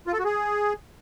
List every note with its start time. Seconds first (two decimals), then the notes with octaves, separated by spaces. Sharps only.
0.07 F4
0.13 A4
0.19 F#4
0.25 G#4